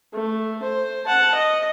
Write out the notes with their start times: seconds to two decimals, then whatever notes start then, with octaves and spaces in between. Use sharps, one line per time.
0.13 A3
0.63 C5
1.06 F#5 A5
1.35 D#5